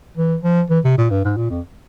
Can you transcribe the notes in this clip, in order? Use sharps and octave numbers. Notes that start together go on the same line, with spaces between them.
E3
F3
E3
C3
A#2
G2
G#2
A#2
F2